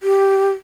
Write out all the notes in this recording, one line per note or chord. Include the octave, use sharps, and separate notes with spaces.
G4